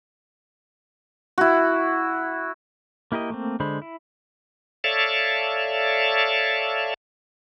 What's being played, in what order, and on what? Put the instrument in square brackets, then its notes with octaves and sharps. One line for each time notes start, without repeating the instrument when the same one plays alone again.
[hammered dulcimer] E4 F#4
[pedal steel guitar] A#3 E4 G4 A#4 D#5
A3 A#3 C4
D3 G#3 C5 B5
E4
[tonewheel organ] A4 C#5 D5 E5 F5 A5